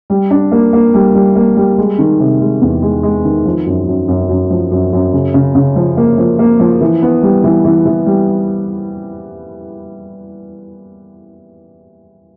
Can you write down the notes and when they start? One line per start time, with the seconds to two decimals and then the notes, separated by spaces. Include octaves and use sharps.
0.10 G3
0.31 D4
0.52 A#3
0.73 A#3
0.94 G3
1.15 G3
1.36 A#3
1.57 G3
1.78 G#3
1.99 D#3
2.19 C3
2.41 G#3
2.61 E2
2.82 G#3
3.03 G#3
3.25 D#3
3.45 F3
3.66 F#2
3.87 F#2
4.08 F#2
4.29 F#2
4.50 F3
4.71 F#2
4.93 F#2
5.13 C#3
5.34 C#3
5.55 C#3
5.76 F3
5.97 A#3
6.18 F3
6.39 A#3
6.60 F3
6.81 E3
7.02 B3
7.23 G3
7.44 E3
7.64 E3
7.86 E3
8.06 G3